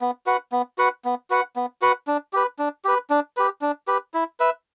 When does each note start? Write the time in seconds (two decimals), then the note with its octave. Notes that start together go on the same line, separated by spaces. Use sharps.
0.01 B3
0.26 F#4 B4 F#5
0.52 B3
0.78 F#4 B4 F#5
1.05 B3
1.30 F#4 B4 F#5
1.56 B3
1.82 F#4 B4 F#5
2.07 D4
2.33 G4 B4
2.59 D4
2.85 G4 B4
3.10 D4
3.37 G4 B4
3.62 D4
3.88 G4 B4
4.14 E4
4.40 B4 E5